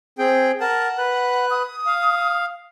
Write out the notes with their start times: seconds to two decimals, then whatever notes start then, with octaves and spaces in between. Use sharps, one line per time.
0.19 C4 G#4 G5
0.61 A#4 F#5 A5
0.98 B4 F#6
1.50 D#6
1.86 F5